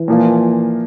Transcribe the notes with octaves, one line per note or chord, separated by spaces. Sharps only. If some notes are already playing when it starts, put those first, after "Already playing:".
Already playing: E3
A#2 F3 A#3 F4